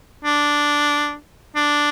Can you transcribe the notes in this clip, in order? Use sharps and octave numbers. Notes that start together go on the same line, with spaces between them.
D4
D4